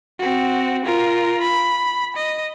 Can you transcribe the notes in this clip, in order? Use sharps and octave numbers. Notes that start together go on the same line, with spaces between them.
C4 F#4
F4 A#4
B5
D#5